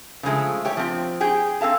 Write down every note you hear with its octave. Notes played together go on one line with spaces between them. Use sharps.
C#3 F3 G#3 A3
A3 G4 C#5
F3 C4
G4 G#4 G5
C4 A4 F5 A5